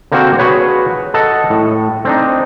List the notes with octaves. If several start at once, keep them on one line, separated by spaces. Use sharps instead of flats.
D3 A#3 C4 F#4 A#4 C5
F#4 G#4 B4 C#5
A4 D#5 F#5 A5
A2
C4 D4 D#4